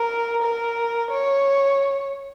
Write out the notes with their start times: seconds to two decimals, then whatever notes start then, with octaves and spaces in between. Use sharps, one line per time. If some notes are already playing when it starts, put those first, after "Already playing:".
Already playing: A#4
0.43 A#4
1.11 C#5